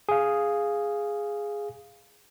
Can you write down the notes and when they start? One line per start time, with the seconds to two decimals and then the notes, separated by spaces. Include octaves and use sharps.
0.09 G#4 F5